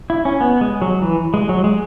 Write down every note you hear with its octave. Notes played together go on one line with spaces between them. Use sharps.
E4
C#4
B3
G#3
F#3
E3
G#3
F#3
G#3